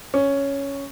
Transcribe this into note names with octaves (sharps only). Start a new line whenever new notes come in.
C#4